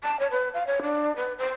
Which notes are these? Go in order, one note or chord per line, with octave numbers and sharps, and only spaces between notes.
A5
C#5
B4
F5
C#5
D4
B4
C5